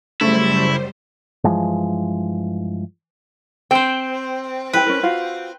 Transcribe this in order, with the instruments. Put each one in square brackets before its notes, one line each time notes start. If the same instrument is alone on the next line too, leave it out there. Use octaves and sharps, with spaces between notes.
[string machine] F#2 G3 C5 [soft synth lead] C#3 [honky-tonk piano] A3 [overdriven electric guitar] E4
[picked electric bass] G2 E3 F3 G#3
[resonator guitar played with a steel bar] C4 [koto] C5 G5
[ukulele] E4 G4 G5 [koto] B4
[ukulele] C#4 A#4
F4 F#4 F5